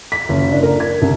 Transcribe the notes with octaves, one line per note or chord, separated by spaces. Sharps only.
B6
F#1
D4
A#4
G#6
C2